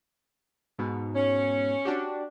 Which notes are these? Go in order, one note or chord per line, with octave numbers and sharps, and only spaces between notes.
G#2 B2
C#4
D4 F#4 G4